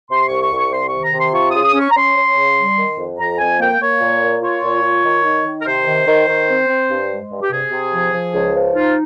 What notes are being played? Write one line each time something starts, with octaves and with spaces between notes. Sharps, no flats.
C3 C6
C2 C#6
C#6
C2
C#6
C3 C6
C#6
D#3
A#5
C3 C6
F4 C#6
C#3 D#6
D#6
C#4
C#6
A#5
C#4 C6
C#4
C#3
G3
D#3
F2
F2 A#5
F2 G#5
A#3 G5
A#3 C#5
A#2
A#3
F4 C#5
A#2
F4
D#3
D#4
D#3
A#4
C3 C5
D#3
D#3
D#3
C4
C4
G2
G#3
G2
G4
C3 G#4
C3
F3
F3
C#2
F3
D#4 F4